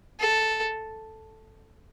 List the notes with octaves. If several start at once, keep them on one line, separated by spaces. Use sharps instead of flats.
A4